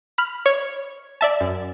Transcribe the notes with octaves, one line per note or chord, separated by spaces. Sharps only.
B5 F6
C#5
D5 E5 A5
F#2